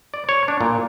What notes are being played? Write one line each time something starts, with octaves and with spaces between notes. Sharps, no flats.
D5
C#5
D4
A#2